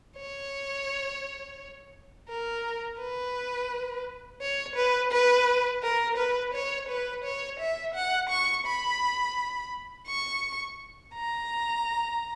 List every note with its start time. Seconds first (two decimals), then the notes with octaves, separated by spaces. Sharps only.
0.17 C#5
2.28 A#4
2.99 B4
4.41 C#5
4.76 B4
5.11 B4
5.83 A#4
6.17 B4
6.54 C#5
6.89 B4
7.25 C#5
7.60 E5
7.94 F#5
8.29 C#6
8.66 B5
10.07 C#6
11.14 A#5